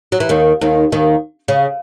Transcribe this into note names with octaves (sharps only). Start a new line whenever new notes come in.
F#3
E3
D#2 D#3
D#2 D#3
D#2 D#3
C#3